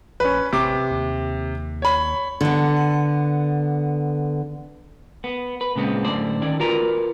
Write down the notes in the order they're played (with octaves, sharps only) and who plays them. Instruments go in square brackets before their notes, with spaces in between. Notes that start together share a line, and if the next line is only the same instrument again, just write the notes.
[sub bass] A#1 [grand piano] C#4 B4
[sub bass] A1 [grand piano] C3 D6
[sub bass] D#2
[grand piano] C#5 B5
[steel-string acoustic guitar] D3 B3
[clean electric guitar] B3
B4
A#2 C#3 G#3 B3 C4
F#2 A2 D3 C5 D5
D#3 C#4 E4 D5
F4 F#4 A#4 B4 A#5